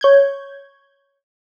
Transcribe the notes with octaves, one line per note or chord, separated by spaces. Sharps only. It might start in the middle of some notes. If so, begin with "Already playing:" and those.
C#5 G6 G#6